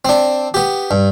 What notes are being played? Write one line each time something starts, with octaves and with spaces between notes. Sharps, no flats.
C4 D4
B3 G4
G2